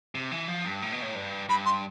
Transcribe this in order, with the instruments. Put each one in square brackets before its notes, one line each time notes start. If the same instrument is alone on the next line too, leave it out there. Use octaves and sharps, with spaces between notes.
[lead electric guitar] C3
E3
F3
G2
A2
B2
A2
G2
[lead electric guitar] G2 [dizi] B5
[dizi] C6